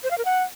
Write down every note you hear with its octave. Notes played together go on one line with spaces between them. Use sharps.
C5
F5
A#4
F#5